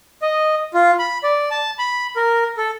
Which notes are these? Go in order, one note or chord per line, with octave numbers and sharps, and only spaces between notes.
D#5
F4
B5
D5
A5
B5
A#4
A4